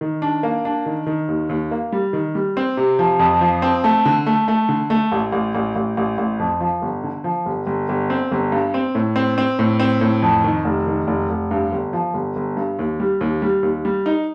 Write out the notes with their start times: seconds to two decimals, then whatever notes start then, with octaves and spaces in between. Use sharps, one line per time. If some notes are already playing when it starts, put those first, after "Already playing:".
0.01 D#3
0.22 D4
0.43 A#3
0.65 D4
0.86 D#3
1.06 D#3
1.28 D#2
1.49 D#2
1.71 A#3
1.92 G3
2.13 D#3
2.35 G3
2.57 C4
2.77 C3
2.99 F3
3.19 F2
3.41 F3
3.62 C4
3.84 A3
4.05 D3
4.26 A3
4.48 A3
4.69 D3
4.90 A3
5.12 A1
5.32 A1
5.55 A1
5.76 A1
5.97 A1
6.18 A1
6.39 F2
6.60 F3
6.82 G1
7.04 D3
7.24 F3
7.46 G1
7.67 G1
7.89 G1
8.10 C4
8.32 G1
8.52 G2
8.74 C4
8.95 A2
9.16 C4
9.38 C4
9.59 A2
9.80 C4
10.01 A2
10.22 F2
10.44 D#3
10.65 F1
10.86 D#3
11.07 F1
11.29 F1
11.51 G2
11.72 G1
11.93 F3
12.14 G1
12.36 G1
12.57 G2
12.79 D#2
13.00 G3
13.21 D#2
13.42 G3
13.63 D#2
13.85 G3
14.06 D#4